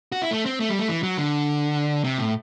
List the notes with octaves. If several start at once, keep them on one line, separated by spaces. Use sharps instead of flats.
F#4
E4
A3
C4
A3
G3
A3
E3
F#3
D3
C3
A2